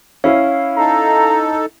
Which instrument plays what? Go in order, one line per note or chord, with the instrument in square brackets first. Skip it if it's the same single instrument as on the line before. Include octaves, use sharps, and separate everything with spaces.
[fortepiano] C#4 E4 [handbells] F5
[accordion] D#4 A4 [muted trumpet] A#5